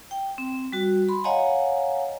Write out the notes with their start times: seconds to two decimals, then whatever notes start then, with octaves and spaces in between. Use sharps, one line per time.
0.11 G5
0.38 C4
0.72 G3 F#4
1.09 B5 C6
1.24 C#5 D#5 F5 F#5 G#5 A#5